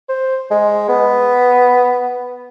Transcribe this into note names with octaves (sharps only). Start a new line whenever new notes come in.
C5
G#3
B3